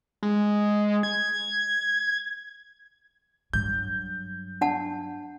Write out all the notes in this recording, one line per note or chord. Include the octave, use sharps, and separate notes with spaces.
G#3
G#6
G2 F#3 G6
D4 F#5 A5